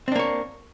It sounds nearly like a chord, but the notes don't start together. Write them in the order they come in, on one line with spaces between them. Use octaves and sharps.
C4 D4 A#3 C#5